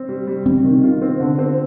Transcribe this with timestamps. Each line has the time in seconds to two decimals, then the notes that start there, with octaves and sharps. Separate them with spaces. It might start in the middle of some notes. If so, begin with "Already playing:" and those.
Already playing: C4
0.09 G3
0.27 G3
0.46 G3 C4
0.64 D#3
0.83 F4
1.02 C4
1.20 D3
1.39 C4